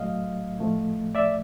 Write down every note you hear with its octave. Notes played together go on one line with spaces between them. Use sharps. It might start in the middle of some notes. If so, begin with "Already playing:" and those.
Already playing: A2 F#3 A3 D#5 F5
A2 F3 A3
D5 E5